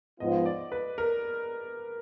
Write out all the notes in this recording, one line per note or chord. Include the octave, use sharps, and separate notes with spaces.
G#2 F3 B3 F4 D#5
D5
B4
A#4